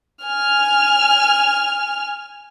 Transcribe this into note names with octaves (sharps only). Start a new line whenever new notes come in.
G#5 F6